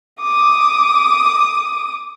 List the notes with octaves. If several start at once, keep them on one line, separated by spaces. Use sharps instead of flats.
D6 D#6